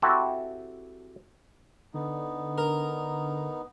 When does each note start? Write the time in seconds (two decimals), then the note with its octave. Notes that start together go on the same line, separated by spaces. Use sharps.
0.02 C4 E4 F#4 G4 A4
1.94 D3 B3 D#4
2.58 A#4